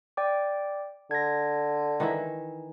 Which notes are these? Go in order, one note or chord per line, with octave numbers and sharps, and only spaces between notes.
D5 G5 D6
D3 G#6 A#6
D#3 E3 E5